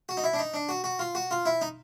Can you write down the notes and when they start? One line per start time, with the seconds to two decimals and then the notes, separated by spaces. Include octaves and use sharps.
0.09 F#4
0.17 D#4
0.24 E4
0.33 D4
0.39 D#4
0.54 D4
0.69 F#4
0.84 F#4
0.99 F4
1.15 F#4
1.31 F4
1.46 E4
1.61 D#4